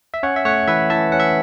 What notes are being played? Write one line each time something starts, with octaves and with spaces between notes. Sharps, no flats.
E5
C#4 C#5 F#5
E5
A3 C#5 F#5
E3 B4 E5
E3 E5 A5
C#4 F#5
E5